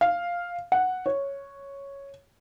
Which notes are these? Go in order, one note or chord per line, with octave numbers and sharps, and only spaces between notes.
F5
F#5
C#5